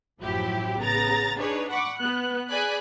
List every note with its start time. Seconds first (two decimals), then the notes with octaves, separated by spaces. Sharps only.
0.20 A1 F#2 F3 F#3 E4 G4
0.79 A1 C#3 B3 A#5 A6 A#6
1.39 D4 D#4 G#4 B4 C#5
1.70 F#5 B5 C#6 D6
1.98 B3 F#6
2.49 G#4 D5 G#5 B5 F#6